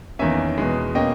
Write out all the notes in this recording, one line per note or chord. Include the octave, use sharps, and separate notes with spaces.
E2 D#3 A#3 C#4 E5 G#5
E2 B2 G#3
B2 A#3 C#4 D#5 G5